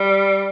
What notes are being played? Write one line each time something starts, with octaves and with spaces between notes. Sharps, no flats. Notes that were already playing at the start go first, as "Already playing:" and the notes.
Already playing: G3